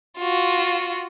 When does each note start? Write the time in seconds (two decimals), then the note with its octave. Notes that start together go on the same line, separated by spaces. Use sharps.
0.18 F4 F#4